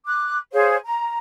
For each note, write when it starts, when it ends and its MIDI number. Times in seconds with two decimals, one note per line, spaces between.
0.05 0.37 86
0.05 0.37 90
0.52 0.76 68
0.52 0.76 72
0.52 0.76 73
0.52 0.76 77
0.84 1.18 82